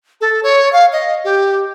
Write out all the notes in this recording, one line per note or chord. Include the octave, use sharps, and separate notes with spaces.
A4
C#5
F5
D#5
G4